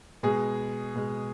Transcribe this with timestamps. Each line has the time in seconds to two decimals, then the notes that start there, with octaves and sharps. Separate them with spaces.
0.23 B2 G#3 G#4
0.95 B2 G#3